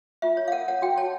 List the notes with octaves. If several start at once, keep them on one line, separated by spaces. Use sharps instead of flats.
F4 E5
C#5
F5
A#4 F#5
C#5 F#5
F#4 G5
C#5 A5